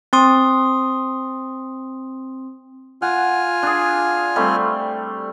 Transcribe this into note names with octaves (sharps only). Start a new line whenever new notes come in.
C4 C6 D#6
F4 F#5 G#5 F6
D4 G#4
G3 A3 C4